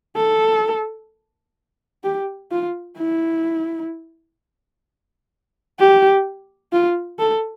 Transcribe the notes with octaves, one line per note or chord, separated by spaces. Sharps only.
A4
G4
F4
E4
G4
F4
A4